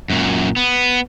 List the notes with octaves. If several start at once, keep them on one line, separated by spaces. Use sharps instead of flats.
F#2 A#2
B3